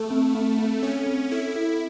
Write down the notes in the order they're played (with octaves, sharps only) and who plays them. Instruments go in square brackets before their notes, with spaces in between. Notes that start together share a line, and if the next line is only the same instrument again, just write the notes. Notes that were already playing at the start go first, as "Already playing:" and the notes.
Already playing: [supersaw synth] A3 [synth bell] A4
[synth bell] C4
C4
C4
[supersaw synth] C#4 [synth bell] A4
[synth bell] C4
[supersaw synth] E4 [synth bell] A4
[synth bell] A4